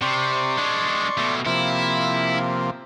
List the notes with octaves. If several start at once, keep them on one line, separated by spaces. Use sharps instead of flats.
C3 D5 C6 C#6
G#3 D4
B2 A3
C3 F3 A#3 E4